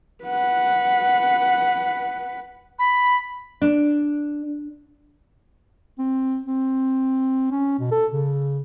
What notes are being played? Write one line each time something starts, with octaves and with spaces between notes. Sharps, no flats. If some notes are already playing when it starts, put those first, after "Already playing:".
B4 F#5
B5
D4
C4
C4
C#4
B2
A4
C#3